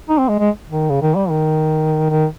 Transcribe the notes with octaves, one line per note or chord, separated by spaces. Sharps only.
D#4
C4
G#3
G#3
D#3
C#3
D#3
G3
D#3
D#3